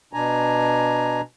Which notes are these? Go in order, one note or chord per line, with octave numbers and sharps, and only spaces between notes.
B2 D4 G#5 A#5